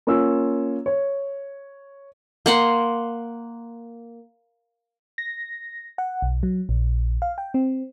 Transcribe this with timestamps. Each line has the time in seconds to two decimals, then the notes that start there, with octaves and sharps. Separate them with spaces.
0.07 A#3 C#4 F4 E6
0.86 C#5
2.46 A#3 F#5 C6
5.18 A#6
5.98 F#5
6.22 B1
6.43 F#3
6.69 A#1
7.22 F5
7.38 G5
7.54 C4